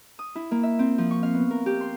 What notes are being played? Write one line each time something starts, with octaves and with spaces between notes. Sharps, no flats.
D#6
E4
A#3
E5
C4
F3
C#6
F5
B3
A#4
G4
C6